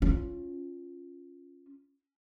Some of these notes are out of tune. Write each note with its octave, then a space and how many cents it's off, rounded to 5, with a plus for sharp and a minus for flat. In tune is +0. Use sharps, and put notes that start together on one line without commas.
C#4 +0 F4 +0